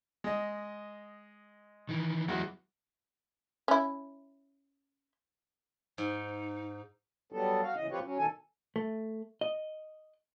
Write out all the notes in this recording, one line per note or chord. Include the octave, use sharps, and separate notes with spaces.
G#3 D#5
D#3 E3
E2 F#3 G#3 F#4
C#4 E4
G#2 D#4
F#3 G3 B3 A4
F#4 F5
C#3 E3 D#5
F3 C4 F4 G4 B4 C#5
F#3 C#4
B2 D#3 A4 G#5
A3
D#5